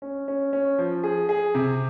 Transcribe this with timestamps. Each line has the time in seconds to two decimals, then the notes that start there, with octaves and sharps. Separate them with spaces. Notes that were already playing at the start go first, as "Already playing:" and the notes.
0.02 C#4
0.28 C#4
0.53 C#4
0.78 F3
1.04 G#4
1.29 G#4
1.55 C3